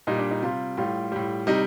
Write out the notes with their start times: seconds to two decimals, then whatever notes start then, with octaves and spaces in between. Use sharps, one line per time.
0.07 A#2 G3 D#4
0.19 D4
0.31 D#4
0.42 C3 G3 F4
0.77 A2 G3 F4
1.12 A2 G3
1.47 C3 G3 D#4